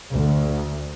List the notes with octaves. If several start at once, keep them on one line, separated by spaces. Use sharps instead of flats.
D2